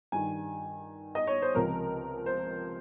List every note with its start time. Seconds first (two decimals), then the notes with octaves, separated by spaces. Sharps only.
0.12 G2 D#3 G#5
1.15 D#5
1.27 C#5
1.42 C5
1.55 C#2 C3 F3 A#4
2.26 C5